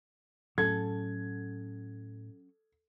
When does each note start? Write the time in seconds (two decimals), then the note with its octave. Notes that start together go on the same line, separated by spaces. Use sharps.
0.58 A2 F#3 C#4 A4 G#6